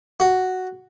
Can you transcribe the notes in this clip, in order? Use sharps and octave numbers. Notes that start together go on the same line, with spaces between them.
F#4